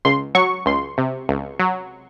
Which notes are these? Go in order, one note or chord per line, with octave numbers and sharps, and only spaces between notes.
C#2 C6
F#3 C#6
C#2 C6
C3
C#2
F#3